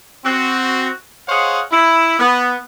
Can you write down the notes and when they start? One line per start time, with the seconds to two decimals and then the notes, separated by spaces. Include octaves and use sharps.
0.25 C4 F#4
1.28 G#4 C5 C#5 D#5 F5 F#5
1.71 E4
2.19 B3